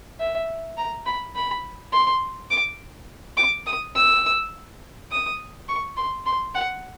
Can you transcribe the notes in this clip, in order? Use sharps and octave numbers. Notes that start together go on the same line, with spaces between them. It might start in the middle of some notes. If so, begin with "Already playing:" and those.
E5
A#5
B5
B5
C6
D6
D6
D#6
E6
D#6
C#6
C6
C6
F#5